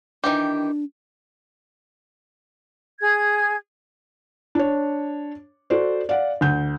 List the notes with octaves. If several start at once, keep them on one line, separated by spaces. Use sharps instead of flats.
D#3 E3 D4 G4
G#4 G#6
D4 C#5
F#4 A4 C5 D5
D5 F5 F#5
D2 G6